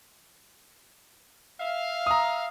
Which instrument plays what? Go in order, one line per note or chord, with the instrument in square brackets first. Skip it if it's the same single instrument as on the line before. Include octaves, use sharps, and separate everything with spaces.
[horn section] E5 F5
[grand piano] A#5 D#6